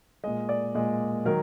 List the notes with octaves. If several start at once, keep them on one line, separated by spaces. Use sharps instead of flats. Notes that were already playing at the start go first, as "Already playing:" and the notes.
A#2 G#3 D#5
D5
A#2 G#3
D#3 F#3 A#4